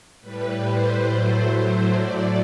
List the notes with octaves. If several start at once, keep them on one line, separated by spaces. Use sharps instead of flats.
A2 G3 B4
C5
A2 F#3 A3
A2 F#3 A3 D5